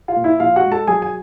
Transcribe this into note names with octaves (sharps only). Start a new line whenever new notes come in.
F4 F5
A#2
E4 E5
A#1 F4 F5
F#4 F#5
G#3
A4 A5
F#3 G#4 G#5
G#5